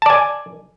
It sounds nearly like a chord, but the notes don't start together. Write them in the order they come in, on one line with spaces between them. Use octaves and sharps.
A5 D5 G#5